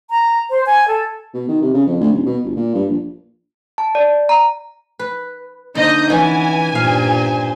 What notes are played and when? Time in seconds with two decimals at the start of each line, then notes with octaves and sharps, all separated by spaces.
0.10 A#5
0.50 C5
0.66 G#5
0.88 A4
1.34 B2
1.48 D#3
1.61 C3
1.74 C#3
1.86 F2
2.00 D2
2.12 D#1
2.26 B2
2.43 G1
2.56 A#2
2.74 G2
2.88 A#1
3.78 A5
3.95 D5
4.29 A#5
4.99 B4
5.75 D3 A#3 D#4 C5 D#5 G6
6.10 E3 B3 C#4 G#5
6.75 G2 A#2 C5 F5